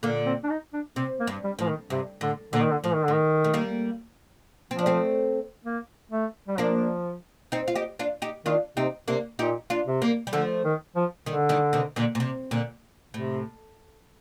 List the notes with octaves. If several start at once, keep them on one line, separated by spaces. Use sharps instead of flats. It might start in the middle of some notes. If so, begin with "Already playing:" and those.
A#2 D3 A#3
C4
D4
D#4
D4
C3 C4
A#3
G2
G3
A2 F3
D#3
G2 C3
A2 D3
A#2 D3
D#3
D3
A2 F3
D#3
D3
A2
D#3
A3
G3 A#3
F3 C4
D4
A3 C4
A#3
A3
G3
F3 A#3 D4
C4 D#4
F4
D#4 G4
D4 F4
D#4 G4
D#3 D4 F4
C3 C4 D#4
C3 A#3 D4
A#2 D#4 G4
D4 F4
C3
G3 A#3
G3
D3 F3 A3
D#3
F3
D3 D#3 G3
D#3 G3
C3 D#3
A#2 D3
A#2
C3
A#2 D3
A2 C3